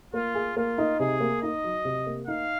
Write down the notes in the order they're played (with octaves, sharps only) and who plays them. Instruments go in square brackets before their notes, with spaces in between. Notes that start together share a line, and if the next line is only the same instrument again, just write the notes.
[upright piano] A#3 [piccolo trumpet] F4
[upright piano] G#4
[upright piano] A#3 [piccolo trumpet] F4
[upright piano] D#4
[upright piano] C3 [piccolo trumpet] G#4
[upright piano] A#3
[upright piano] D#4 [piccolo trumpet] D#5
[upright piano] F#3
C3
A#3
[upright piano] D#4 [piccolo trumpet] F5